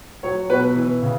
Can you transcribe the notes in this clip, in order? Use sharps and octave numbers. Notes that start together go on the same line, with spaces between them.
F#3 C#5
B2 B4
E3
C#3